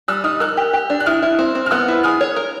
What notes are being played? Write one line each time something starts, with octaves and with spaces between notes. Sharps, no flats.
G3 E6 F#6
D#4 D#6 F6
A#4 E6 F#6
G4
G4
D4
F#6
E4 D#6 F6
E4
C4
C4
F6
B3 E6 F#6
E4
G#4 D#6 F6
C#5
A#4